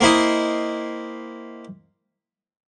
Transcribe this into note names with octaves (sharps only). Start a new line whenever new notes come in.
A#3 C4 E4 D#5